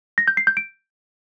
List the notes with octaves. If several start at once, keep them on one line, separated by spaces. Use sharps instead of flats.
A#6
G6
C7
G6
D7